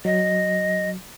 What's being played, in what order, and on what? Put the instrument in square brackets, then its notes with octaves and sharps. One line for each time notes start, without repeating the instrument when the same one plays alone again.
[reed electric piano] F#3 [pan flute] D#5